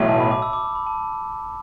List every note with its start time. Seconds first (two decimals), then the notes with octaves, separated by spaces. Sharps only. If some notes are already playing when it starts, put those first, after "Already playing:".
Already playing: B1 A2 E3
0.09 A5
0.20 B5
0.31 D6
0.42 E6
0.53 D6
0.75 B5
0.87 A5